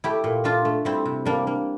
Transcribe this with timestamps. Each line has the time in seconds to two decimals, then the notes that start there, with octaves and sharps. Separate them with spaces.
0.04 A3 E4 G4
0.24 A#2
0.44 A3 D4 F4
0.65 A3
0.85 G3 C4 E4
1.05 C3
1.25 G3 A#3 D4
1.47 A#3